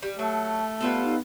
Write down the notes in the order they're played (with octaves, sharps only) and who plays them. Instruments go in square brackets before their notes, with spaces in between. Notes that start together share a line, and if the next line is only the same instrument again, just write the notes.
[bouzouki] G3
[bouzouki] F#3 [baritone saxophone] A3 [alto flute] A5
[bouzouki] G3 F4 A4 [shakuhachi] B3
[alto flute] D#4